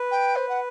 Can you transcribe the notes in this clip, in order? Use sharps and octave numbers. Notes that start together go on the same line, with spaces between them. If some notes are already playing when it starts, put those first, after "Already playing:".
Already playing: B4
G5
C5
F#5